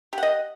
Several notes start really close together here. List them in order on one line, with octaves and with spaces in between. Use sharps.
G4 F#5 D#5